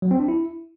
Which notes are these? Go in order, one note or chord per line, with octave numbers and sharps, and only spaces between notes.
F#3
C4
D4
E4